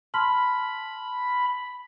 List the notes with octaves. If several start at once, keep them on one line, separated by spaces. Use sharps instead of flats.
A5 B5 C6 F6